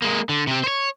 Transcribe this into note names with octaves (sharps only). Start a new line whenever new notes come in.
G#3 A#3
D3
C3 C4
C5 C#5